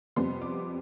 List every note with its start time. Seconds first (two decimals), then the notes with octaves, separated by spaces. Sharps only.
0.16 F2 C3 G3 B3 C6
0.42 D6